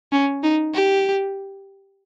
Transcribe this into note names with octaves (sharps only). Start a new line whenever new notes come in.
C#4
D#4
G4